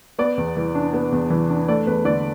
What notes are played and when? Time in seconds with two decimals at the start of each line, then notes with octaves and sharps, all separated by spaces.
0.19 B3 D5
0.37 E2
0.56 E3
0.75 D4
0.93 B3
1.12 E2
1.30 E3
1.49 D4
1.68 A3 D5
1.87 E2 B4
2.05 D3 D5